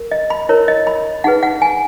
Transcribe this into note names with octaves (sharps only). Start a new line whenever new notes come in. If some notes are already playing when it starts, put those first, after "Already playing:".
Already playing: A#4
D#5
B5
E4 A#4 C#5
D#5
B5
D#4 G#4 B4 F#5
F#5
G#5